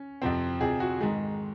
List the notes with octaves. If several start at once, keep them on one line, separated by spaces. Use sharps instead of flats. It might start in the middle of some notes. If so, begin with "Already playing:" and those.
Already playing: C#4
F2 C3 F3 C4
F2 C3 F3 G#4
F#4
G#2 D#3 G#3